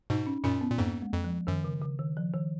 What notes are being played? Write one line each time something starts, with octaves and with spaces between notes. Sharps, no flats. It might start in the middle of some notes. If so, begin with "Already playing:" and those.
G#2 B2 D#4
C#4
F#2 A#2 C#4
B3
A#2
F2 G#2 A#3
G#3
F2
F3
F#2 D#3
C#3
C#3
D#3
F3
D#3